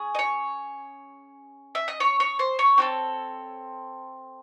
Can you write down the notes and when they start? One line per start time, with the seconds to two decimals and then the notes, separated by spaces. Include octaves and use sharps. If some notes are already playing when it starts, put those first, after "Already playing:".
Already playing: C#4 G#4
0.15 D#5
0.19 C#5
1.75 E5
1.88 D#5
2.00 C#5
2.20 C#5
2.39 C5
2.59 C#5
2.78 C4 F#4 A4